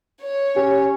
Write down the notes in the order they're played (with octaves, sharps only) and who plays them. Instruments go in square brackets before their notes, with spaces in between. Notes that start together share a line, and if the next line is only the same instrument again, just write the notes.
[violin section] C#5
[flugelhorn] C#4 [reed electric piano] G4